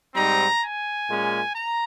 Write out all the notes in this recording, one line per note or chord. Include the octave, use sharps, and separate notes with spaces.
G#2 G3 C4 D#4 A#5
G#5
A#2 G#3 C#4
A#5